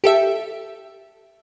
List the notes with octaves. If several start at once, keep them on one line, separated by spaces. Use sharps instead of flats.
G4 A4 E5